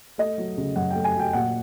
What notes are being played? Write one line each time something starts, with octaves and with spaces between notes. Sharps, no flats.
A3 D#5
F#3
C#3
F#2 F#5
A3 G5
G#5
F#3 G5
A#2 F#5